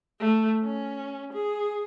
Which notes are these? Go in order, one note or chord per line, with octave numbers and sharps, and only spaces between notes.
A3
C#4
G#4